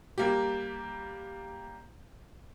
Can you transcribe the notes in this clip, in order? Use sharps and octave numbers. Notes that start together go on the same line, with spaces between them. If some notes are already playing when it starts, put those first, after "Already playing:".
G3 A#3 G4